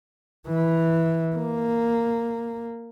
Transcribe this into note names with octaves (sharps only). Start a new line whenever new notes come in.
E3
A#3